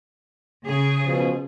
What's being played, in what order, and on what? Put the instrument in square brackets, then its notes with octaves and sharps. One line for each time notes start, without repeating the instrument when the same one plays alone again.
[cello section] C#3 G#4
[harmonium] B2 F3